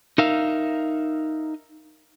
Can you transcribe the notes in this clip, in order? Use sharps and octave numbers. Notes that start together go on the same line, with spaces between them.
D#4 A#4 E5 F5